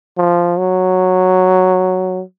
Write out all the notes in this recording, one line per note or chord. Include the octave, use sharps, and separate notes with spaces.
F3
F#3